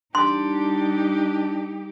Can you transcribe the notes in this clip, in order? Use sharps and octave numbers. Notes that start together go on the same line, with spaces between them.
G3 D4 D#4 G4 C6